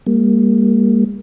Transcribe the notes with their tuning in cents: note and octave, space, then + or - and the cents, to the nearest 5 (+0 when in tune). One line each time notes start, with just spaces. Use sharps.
G3 +45 A#3 +0